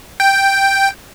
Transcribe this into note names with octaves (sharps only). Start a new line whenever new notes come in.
G5